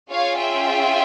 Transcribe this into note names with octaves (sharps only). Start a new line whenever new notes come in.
C#4 F4 G#4 C#5 F5
E5 G5